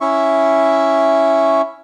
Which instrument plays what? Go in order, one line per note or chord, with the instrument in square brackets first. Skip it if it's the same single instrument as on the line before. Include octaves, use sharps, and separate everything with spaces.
[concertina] C#4 E4 E5 C#6